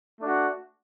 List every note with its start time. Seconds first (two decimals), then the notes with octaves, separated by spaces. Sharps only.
0.21 A3 D4 F#4